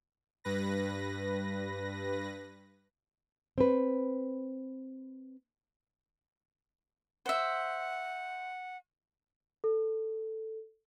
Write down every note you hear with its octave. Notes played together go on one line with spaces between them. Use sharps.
G2 B4 A#6
C4 B4
C5 E5 F#5
A4